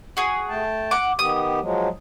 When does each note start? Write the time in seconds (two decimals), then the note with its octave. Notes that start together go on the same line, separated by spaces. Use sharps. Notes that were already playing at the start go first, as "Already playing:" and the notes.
0.17 F#4 G#4
0.49 A3 G5 A5
0.91 F#5 D6
1.19 D#3 B3 G4 D#6
1.61 F3 F#3 G#3